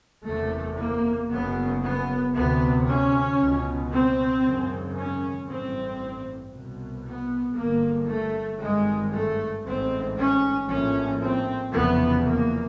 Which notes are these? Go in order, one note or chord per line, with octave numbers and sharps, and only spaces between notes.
F#1 E2 C3 A3
A#3
F#1 F#2 C#3 B3
B3
D2 C3 B3
C#4
C#2 B2
C4
G#1 F#2 C#3
C#4
A1 G2 C4
C2 B2
B3
G1 G2 A#3
A3
G#1 G2 G#3
A3
A1 G#2 C4
C#4
A#1 A2 C#4
C4
F1 E2 C#3 B3
A#3